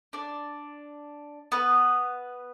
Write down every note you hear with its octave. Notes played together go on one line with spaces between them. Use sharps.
D4 D5
B3 B4